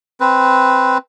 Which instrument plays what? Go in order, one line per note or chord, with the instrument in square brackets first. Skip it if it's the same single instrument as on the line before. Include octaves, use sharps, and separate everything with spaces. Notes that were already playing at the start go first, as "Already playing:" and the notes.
[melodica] C4 B4